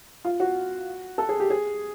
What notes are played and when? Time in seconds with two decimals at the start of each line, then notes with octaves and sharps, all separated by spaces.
0.25 F4
0.40 F#4
1.18 A4
1.29 G#4
1.40 G4
1.50 G#4